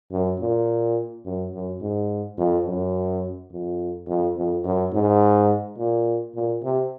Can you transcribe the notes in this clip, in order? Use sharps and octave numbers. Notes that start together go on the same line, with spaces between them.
F#2
A#2
F#2
F#2
G#2
F2
F#2
F2
F2
F2
F#2
G#2
A#2
A#2
C3